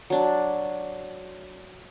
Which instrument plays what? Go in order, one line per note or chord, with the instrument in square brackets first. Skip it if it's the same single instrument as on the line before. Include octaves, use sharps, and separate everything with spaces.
[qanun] F#3 D4